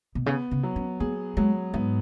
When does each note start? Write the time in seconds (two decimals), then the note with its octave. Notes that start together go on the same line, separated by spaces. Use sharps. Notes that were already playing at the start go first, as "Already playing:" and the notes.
0.15 B2
0.26 C#3 B3
0.51 C#3
0.63 F#3
0.76 C#4
1.00 B3 G#4
1.37 F#3 G#3
1.74 G#2 B3